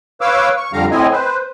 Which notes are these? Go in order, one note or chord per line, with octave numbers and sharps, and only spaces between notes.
B4 C#5 F5 D6 E6
C#6
F2 D3 G3 F5 A#5
A2 C4 E4 D#5 G#5
B4 C5